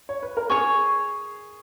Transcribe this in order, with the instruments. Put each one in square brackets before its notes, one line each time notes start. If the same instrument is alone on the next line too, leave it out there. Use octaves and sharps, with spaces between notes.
[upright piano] C#5
B4
A#4
[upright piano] G#4 [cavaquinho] C#5 G#5 C#6